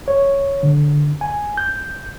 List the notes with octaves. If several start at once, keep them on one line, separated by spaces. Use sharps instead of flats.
C#5
D3
G#5
G6